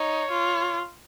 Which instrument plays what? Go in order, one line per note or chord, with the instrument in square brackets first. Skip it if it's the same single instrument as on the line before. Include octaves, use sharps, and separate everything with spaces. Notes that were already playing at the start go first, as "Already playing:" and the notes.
Already playing: [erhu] D#4 [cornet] C#5
[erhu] F4